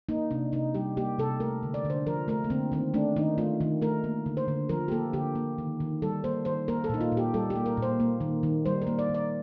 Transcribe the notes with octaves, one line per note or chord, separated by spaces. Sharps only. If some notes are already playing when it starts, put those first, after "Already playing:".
A#3 D#4
C3 D4
C3 D#4
G3 G4
A#3 G4
C3 A4
A3 A#4
D3
D5
D3
C5
F3 A#4
A3 A#4
A#3
D3 C4
D#3 C4
A3 D4
D#3 D#4
A3 F4
D#3
A3 A#4
A#3
D3
C5
D3
F3 A#4
G4
A#3 A4
D3 G4
A#3
D#3
D#3
G3 A4
A#3 C5
D#3 C5
A#3 A#4
A4
A#2 D#4
F4
A#2
G4
G3 A4
G4
A#3
A#4
A#2
C5
A#3
D#3
D#3
G3 C5
A#4
A#3
D5
D#3
D5